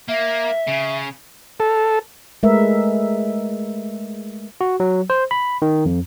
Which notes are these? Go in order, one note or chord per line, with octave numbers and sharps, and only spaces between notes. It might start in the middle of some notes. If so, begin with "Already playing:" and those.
A#3 E5
C#3
A4
G#3 A3 A#4 B4 E5
F#4
F#3
C5
B5
D#3
F2